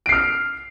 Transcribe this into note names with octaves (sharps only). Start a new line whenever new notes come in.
F6 C7 D7